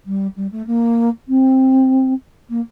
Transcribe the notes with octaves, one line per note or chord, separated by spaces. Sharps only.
G3
G3
A3
A#3
C4
A#3